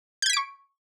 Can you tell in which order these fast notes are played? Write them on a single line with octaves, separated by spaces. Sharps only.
G6 G#6 B6 D7 C#6